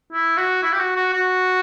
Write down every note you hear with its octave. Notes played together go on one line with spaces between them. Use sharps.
E4
F#4
E4
G4
F#4
F#4
F#4